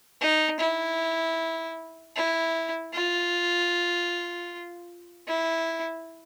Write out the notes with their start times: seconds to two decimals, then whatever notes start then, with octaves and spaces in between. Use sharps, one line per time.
0.22 D#4
0.60 E4
2.16 E4
2.94 F4
5.28 E4